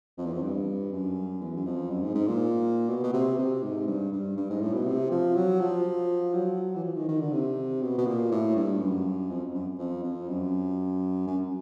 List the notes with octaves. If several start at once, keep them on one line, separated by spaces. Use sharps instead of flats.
F2
E2
F2
G2
F#2
E2
F#2
F2
F#2
G#2
G#2
A#2
B2
B2
C3
C3
G#2
G2
G2
G2
G#2
A2
B2
C3
F3
F#3
F3
F#3
E3
F3
D#3
D#3
D3
C3
B2
B2
A#2
A2
G2
F#2
F2
F#2
F2
F2
F#2
F#2